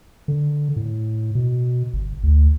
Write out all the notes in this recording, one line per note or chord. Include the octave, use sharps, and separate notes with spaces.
D3
A2
B2
G1
D2